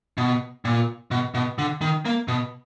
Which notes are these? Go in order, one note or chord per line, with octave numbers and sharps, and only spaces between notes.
B2
A#2
B2
B2
D3
D#3
A#3
B2